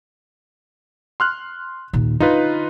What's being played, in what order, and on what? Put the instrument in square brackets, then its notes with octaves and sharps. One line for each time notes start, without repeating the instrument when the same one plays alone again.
[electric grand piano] C6 F6 F#6
[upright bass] D#2 A#2
[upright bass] D3 [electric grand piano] D#4 F4 B4